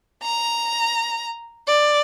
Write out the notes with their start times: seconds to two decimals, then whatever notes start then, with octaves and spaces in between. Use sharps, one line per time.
0.23 A#5
1.67 D5